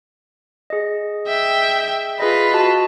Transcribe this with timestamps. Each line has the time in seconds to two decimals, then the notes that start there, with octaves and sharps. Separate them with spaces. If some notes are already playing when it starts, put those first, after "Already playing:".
0.70 G#4 D#5
1.27 E5 G5
2.20 F4 G#4 B4 D#5
2.53 F#4 D#5 A5